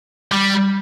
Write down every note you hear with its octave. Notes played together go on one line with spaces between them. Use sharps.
G3